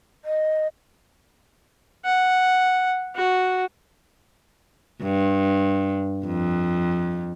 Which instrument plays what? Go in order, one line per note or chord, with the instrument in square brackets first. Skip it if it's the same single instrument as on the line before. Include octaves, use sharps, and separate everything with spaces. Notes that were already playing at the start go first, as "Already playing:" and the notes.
[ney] D#5
[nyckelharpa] F#5
F#4
[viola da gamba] G2
F2